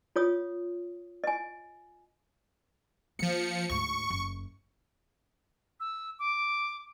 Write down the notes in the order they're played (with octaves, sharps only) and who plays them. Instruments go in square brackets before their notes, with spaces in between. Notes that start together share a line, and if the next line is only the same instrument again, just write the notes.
[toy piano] F4 C#5 D#6
D#5 G#5
[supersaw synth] F3 C#7 [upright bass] A#3
[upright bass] D2 G#2 [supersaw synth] C#6
[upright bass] F#1
[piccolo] E6
D6